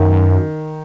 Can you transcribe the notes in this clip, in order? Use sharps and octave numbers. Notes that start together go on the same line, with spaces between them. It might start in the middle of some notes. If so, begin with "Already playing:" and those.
Already playing: F#2 D#3